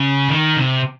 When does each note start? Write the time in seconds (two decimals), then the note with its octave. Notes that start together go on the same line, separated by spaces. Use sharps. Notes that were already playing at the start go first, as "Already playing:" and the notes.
Already playing: C#3
0.29 D#3
0.57 C3